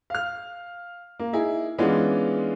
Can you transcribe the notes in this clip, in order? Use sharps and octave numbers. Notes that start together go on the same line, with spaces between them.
F5 F6
A#3
D#4 E4 G#4
E3 G#3 B3 C#4 D4 F4